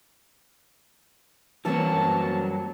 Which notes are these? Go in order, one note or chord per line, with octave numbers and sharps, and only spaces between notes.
E3 F#3 G3 A#3 C4 C#5 A5
F#2